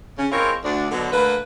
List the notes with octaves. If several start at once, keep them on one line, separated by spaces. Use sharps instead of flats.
C#3 C#4
G#3 C4 E4 F4 A#4 C#5
D2 D4
B2 D3 F#3
D3 A3 A#3 B4